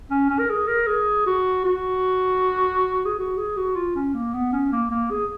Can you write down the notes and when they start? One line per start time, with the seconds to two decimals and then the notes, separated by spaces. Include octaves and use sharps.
0.10 C#4
0.30 C#4
0.39 A#4
0.50 G#4
0.68 A#4
0.87 G#4
1.26 F#4
1.64 F#4
3.05 G#4
3.19 F#4
3.37 G#4
3.57 F#4
3.76 F4
3.95 C#4
4.14 A#3
4.34 B3
4.52 C#4
4.72 A#3
4.91 A#3
5.11 G#4